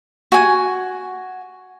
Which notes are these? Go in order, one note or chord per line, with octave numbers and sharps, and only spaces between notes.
F#4 G#5